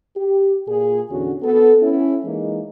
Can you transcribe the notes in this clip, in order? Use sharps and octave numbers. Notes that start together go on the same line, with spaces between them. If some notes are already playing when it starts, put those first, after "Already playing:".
G4
A#2 G#4
E2 D3 C#4 F#4
B3 A4
C#4 E4
E3 G#3 A#3 D#4